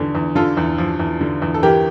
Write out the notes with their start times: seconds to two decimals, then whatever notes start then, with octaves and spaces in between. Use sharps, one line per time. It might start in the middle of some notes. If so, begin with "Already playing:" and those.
Already playing: E2 D3
0.15 E2
0.35 D3 F4 A4
0.57 E2
0.78 F3
1.00 E2
1.21 D3
1.42 E2
1.54 A4
1.63 E3 G4 A#4